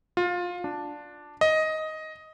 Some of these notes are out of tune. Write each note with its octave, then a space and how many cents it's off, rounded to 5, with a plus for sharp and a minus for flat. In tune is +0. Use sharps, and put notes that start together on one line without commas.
F4 +20
D4 +0
D#5 +10